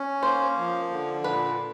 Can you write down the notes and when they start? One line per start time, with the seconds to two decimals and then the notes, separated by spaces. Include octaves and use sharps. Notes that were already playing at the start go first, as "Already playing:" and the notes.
Already playing: C#4
0.22 A#3 C5
0.57 F3
0.91 D3
1.24 A#2 B4